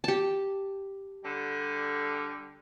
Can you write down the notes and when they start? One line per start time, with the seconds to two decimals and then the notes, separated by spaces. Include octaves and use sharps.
0.04 G4 A5
1.24 D3 G3